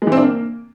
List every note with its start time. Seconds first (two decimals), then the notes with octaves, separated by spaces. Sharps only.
0.02 G#3
0.07 E3
0.12 C4
0.17 D4
0.22 A#3